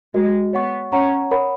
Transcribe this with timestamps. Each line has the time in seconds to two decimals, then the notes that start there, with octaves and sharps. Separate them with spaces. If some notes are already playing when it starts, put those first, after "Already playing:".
0.14 G#3 F#4 A#4 D#5
0.53 B3 C#5 F#5 C#6
0.92 C#4 C#5 F#5 A#5 C#6
1.31 A#4 C#5 F#5 B5